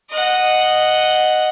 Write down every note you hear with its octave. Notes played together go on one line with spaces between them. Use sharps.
D#5 F#5